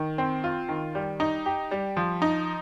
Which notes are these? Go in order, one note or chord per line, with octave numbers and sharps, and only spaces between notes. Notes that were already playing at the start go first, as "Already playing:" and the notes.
Already playing: D#3
C4
F4
D#3
G3
D#4
G4
G3
F3
D#4